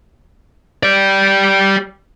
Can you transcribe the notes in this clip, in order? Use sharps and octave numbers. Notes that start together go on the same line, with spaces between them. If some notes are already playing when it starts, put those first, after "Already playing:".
G4 D5